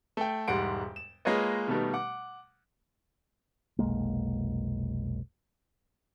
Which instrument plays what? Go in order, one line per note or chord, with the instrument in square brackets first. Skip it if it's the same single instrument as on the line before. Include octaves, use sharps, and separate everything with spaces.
[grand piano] A3 G5
E1 G#2 G3 F#5 C6 D7
E7
G#3 A#3 F4 B4 C#5 D#5
B2 D#3 G3 A3 B3
F#5 D6
[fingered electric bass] F1 B1 G#3 A#3